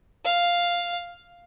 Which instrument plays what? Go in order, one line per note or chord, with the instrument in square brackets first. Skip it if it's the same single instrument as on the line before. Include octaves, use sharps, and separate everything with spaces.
[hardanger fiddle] F5